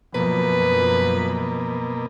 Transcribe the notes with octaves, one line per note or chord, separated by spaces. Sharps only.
F#2 B2 F3 A#3 B4